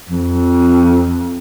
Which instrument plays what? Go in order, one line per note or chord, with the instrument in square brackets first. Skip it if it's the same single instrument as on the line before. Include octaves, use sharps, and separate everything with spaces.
[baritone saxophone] F2